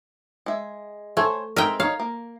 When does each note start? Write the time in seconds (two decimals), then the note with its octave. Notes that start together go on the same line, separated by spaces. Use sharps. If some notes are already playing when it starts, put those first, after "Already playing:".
0.46 G#3 E5
1.17 A3 C5 C#5 G#5
1.56 G#3 C4 D#4 A#4 E5 G5
1.80 D#4 C#5 F5
2.00 A#3